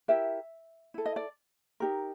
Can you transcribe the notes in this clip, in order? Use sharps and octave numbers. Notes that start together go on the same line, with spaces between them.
E4 G4 A#4 E5
E4 A4
D#5
D5
D#4 G4 A#4